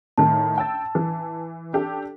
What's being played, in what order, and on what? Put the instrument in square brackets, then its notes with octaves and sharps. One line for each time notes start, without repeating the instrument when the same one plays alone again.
[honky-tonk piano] A2 D#3 [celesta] A5
[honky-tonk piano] G5 E6 A6
E3
D4 G4 A4